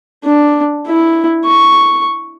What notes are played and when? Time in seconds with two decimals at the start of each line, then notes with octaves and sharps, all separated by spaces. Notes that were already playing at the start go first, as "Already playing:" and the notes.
0.24 D4
0.87 E4
1.45 C#6